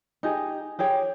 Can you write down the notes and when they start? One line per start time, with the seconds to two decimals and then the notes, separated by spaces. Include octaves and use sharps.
0.23 D#4 G4 G#4
0.79 G4 G#4 C#5 G5